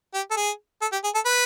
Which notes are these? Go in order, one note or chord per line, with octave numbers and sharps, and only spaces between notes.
G4
A4
G#4
A4
G4
G#4
A4
B4